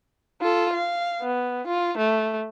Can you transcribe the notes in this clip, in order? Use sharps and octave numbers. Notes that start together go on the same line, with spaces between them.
F4 A4
F5
B3
F4
A3